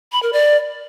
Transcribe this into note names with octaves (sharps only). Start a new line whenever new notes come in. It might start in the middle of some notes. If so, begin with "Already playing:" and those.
B5
A#4
D5